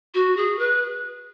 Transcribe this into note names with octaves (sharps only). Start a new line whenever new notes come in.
F#4
G#4
B4